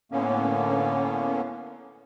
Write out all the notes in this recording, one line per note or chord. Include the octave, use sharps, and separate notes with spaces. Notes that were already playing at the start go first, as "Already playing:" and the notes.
A2 D3 A#3 B3 C#4